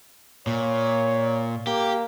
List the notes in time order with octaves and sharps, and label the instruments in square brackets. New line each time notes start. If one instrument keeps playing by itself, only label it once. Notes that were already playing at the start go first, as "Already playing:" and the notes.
[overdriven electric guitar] A#2 [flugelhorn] C#5
[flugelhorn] A#3 [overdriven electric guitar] G4